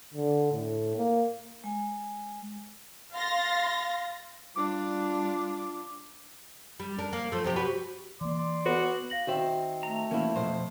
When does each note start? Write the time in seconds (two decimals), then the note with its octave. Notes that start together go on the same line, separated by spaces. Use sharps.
0.14 D3
0.53 A2
0.97 A#3
1.64 G#3 G#5
3.13 F5 C6 A6 A#6
4.56 G3 D4 F4 D6
6.80 G3
6.99 D4 A#4
7.13 A#3
7.32 F3 A3
7.44 C3 F3 G4
7.56 F#4 G4 B4
8.21 E3 A#3 D5 C6 D6
8.66 B3 F#4
9.10 F5 A#6 F#7
9.27 D#3 C4 F#4 E5 G5
9.83 A3 A#5
10.11 E3 A#3 C4 C#4 E4
10.36 F2 B2 F3 C5